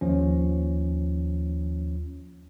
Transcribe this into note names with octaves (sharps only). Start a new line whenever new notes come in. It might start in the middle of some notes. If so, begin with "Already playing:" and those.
D#2 F3 C#4